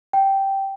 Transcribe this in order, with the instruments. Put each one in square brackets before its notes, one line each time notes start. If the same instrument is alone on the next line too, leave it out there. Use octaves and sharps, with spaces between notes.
[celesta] G5